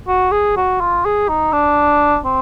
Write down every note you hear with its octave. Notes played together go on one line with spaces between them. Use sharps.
F#4
G#4
F#4
F4
G#4
D#4
D4
C4